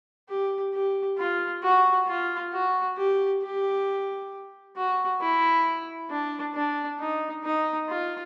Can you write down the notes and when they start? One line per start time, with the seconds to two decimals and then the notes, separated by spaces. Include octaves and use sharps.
0.29 G4
0.74 G4
1.18 F4
1.63 F#4
2.08 F4
2.53 F#4
2.97 G4
3.43 G4
4.76 F#4
5.21 E4
6.10 D4
6.55 D4
7.00 D#4
7.44 D#4
7.89 F4